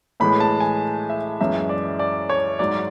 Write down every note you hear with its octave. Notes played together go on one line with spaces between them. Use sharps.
A2 E3 G#3 B5
A5
G#5
E5
F#2 E3 G#3 E5
D5
D5
C#5
G#2 F#3 D5